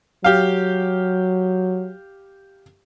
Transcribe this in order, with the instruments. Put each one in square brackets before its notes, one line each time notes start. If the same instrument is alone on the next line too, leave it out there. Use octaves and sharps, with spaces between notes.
[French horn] F#3 [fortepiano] G4 F5